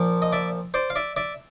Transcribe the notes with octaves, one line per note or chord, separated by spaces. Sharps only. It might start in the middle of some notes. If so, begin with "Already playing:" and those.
Already playing: A#2 F3
D#5
D5 E5
C5 D5
F5
D5 E5
D5 E5